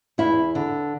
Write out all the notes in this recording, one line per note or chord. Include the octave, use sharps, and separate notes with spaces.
E2 E4
D3